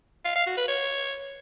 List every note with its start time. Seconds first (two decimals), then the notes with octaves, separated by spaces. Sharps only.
0.25 F5
0.36 F5
0.46 F#4
0.57 B4
0.68 C#5